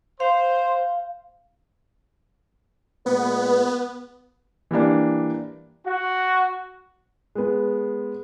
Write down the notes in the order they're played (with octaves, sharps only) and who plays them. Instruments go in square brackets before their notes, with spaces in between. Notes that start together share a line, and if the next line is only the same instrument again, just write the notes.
[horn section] C5 [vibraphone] F5
[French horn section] A#2 G#3 B4 [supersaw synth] B3
[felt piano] E3 G3 A#3 D4
[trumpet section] F#4
[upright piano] G#3 B3